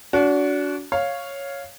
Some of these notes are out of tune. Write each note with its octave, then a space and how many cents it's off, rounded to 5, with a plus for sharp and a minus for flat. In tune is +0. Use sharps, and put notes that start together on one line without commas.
D4 -35 F#4 -5
C#5 +0 F5 +0